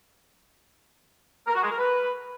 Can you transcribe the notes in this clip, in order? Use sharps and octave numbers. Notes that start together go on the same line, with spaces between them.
A#4
F#4
G#3
A#4
B4